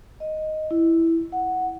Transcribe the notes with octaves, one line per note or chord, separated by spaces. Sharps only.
D#5
E4
F#5